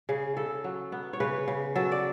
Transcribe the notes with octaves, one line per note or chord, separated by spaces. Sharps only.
C#3 G#4
C#3 A4
F#3
B3
C#5
C#3 B4
C#3
F#3 A4
D5